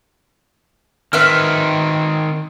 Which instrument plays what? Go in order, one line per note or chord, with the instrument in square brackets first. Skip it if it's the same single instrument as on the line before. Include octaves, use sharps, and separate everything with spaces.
[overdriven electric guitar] D#3 C4 [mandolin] B4 E5 F6